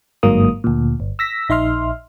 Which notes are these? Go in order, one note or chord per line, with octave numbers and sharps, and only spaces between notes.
G1 G#2 F#3 A#3 D#6
D2 A#2
G1
E6 A#6 B6
A#1 D#4 E5 C6 F6